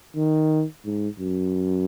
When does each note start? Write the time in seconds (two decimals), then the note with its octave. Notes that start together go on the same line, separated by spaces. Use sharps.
0.16 D#3
0.85 G#2
1.19 F#2